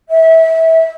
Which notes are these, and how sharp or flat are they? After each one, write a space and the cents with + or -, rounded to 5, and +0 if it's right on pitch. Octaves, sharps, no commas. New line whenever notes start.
E5 -25